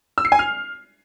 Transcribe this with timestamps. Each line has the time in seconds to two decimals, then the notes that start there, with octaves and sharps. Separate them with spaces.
0.18 E6
0.25 C7
0.32 G#5
0.39 F6